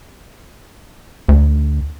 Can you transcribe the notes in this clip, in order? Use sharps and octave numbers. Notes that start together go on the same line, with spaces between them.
D2